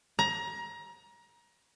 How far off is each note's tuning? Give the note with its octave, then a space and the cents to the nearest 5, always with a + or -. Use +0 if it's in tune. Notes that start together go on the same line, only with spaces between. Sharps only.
A#5 +25